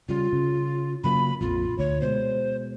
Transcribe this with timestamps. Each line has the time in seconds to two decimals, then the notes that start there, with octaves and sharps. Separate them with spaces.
0.09 C#3 G3 F4
0.33 C#3
1.04 C#3 F#3 A#3 B5
1.41 A#1 F2 F4
1.79 D2 C#5
2.01 B2 G#3 C5